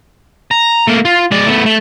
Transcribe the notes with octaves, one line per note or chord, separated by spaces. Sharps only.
A#5
A3 A#3
F4
G#3 D5
A3 B3
A3